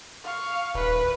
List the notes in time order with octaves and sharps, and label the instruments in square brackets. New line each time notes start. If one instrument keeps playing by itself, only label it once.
[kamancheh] F5 C#6
[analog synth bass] D#1 [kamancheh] B4